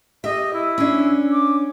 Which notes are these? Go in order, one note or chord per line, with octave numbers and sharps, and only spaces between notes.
G4 D#5 E5
E4
C#4 D4
D6